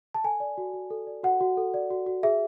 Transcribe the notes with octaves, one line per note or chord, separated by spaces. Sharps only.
A5
A4 G#5
D5
F#4
F#4
A4
D5
F#4 F#5
F#4
A4
D5
F#4
F#4
G#4 E5